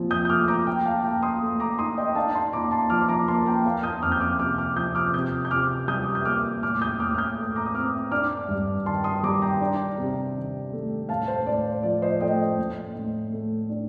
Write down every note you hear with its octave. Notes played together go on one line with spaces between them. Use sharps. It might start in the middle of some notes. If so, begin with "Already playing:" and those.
Already playing: A#2 F3 C4
D#6 G6
G6
A3 D6 F6
A#5 D6
A#2 G5 A#5
F5 A5
A#2 G5 A#5
C6 D#6
A3
A#5 D6
D#4 C6 D#6
D#5 G5
D4 F5 A5
A5 C6
A#2 A#5 D6
A5 C6
F3 D6 F6
A#5 D6
A#3 A5 C6
G5 A#5
A#3 F5 A5
F6
D#6 G6
F2 D6 F6
G6
D6 F6
C3 D6 F6
D6 F6
F3 D#6 G6
D6 F6
C3 D#6 G6
G6
C3 D6 F6
G3 D#6 G6
G6
A#3 D6 F6
A2 D6 F6
D#6 G6
A2 D6 F6
F6
D#6 G6
A3
A#5 D6
D#6
C4 D6 F6
D4 D6 F6
G2
D#3 A5 C6
C6 D#6
G3 A#5 D6
G5 A#5
D4
C3
D#3
A3
A2 F5 A5
C5
A2 D5
C5
F3 D5
C5 D#5
A3 D#5 G5
A2
A2
A3
D4